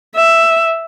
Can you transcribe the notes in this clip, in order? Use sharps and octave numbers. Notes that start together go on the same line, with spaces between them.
E5